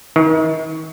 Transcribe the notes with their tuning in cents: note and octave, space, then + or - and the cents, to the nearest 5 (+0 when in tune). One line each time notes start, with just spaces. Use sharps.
D#3 +35